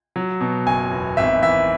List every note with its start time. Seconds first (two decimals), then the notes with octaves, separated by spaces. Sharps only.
0.16 F#3
0.41 B2
0.66 F#1 G#5
0.92 E2
1.17 G#1 E5
1.42 E3 E5